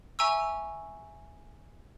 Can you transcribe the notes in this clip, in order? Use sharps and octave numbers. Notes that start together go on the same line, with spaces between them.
E5 G#5 A#5 C#6 E6